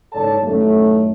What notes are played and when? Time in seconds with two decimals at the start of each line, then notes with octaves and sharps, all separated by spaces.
0.13 F#1 G#2 A4 C#5 D5 A5
0.44 A1 F#2 D#3 F#3 A3